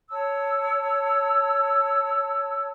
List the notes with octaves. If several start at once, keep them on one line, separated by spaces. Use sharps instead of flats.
C#5 A5 E6